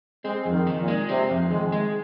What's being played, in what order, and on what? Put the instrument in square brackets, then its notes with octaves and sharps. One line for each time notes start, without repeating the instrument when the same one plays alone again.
[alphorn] G#3 [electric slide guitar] C4
[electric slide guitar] F2
[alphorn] D#3
[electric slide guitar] D#3
[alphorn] A#2
[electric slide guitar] G#3
[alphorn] C3 [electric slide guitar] C4
[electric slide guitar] F2
[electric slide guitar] D#3 [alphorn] G#3
[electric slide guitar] G#3